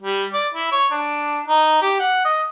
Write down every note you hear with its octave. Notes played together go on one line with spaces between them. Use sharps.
G3
D5
E4
C#5
D4
D#4
G4
F#5
D#5